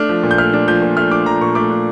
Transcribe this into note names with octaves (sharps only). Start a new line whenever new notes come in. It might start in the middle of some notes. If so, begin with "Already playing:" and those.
Already playing: A3 D4 F6
F3
A#2
G6
A3 F6
D4
F3 G6
A#2
A3 F6
D4 D6
F3 A#5
A#2 C#6
A3 D6
D4